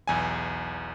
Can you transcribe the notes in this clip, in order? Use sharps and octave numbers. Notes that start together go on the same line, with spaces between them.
B1 E2 G#5